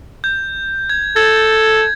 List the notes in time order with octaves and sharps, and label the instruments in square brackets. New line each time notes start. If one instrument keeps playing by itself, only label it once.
[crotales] G6
G#6
[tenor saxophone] A4 [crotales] G#6 A6